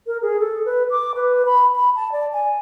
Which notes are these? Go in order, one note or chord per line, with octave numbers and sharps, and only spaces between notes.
A#4
G#4
A4
B4
D6
B4
B5
B5
A5
D5
G#5